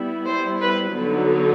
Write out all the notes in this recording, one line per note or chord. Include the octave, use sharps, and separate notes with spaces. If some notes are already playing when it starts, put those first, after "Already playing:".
Already playing: G3 B3 E4
C5
B4
D3 F#3 B3 D#4